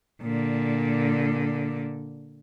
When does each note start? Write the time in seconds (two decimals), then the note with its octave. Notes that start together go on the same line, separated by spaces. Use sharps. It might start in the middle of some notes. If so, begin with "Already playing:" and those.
0.22 A#2 D3